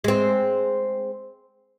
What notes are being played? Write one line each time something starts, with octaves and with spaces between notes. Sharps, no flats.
G#3 C4